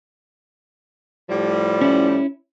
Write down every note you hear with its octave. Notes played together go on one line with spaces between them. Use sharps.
A2 F3 G3
C#4 E4